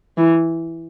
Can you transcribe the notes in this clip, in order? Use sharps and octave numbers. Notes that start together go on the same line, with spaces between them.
E3